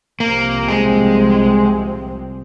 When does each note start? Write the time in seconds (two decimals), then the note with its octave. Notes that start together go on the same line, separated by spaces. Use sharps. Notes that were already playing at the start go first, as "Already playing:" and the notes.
0.20 C2 C3 F3 A#3 C4
0.68 G#3